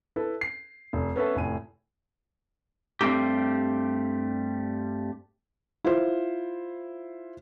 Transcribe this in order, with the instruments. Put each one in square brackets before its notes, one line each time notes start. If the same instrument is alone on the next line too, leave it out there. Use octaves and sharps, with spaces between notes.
[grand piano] E4 A4 B4
C7
F1
B3 C#4 A4 B4 E5
F1 A2 G#5 D#7
[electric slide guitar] G2 G3 A3 C4 D#4 G4
[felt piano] E4 F4 C5